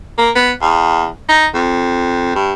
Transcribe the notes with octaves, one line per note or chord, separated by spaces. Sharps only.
A#3
B3
E2
D#4
F2
G2